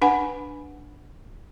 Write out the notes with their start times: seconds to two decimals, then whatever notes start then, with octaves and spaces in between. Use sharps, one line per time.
0.02 D4 B4 F#5 G#5 B5